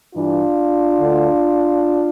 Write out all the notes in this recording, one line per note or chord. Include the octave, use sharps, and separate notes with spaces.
G2 E3 D4 F4
D2 D3